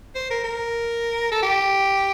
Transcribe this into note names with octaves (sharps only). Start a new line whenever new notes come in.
C5
A#4
A#4
A4
G4